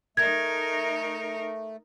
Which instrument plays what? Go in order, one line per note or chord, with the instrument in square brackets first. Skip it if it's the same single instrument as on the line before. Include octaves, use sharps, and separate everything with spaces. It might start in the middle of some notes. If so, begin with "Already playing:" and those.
[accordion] A3 [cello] D#4 A#4 [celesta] G#6